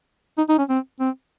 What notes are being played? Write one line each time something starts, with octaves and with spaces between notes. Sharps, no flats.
D#4
D#4
C#4
C4
C4